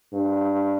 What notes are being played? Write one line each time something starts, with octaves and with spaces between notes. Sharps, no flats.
G2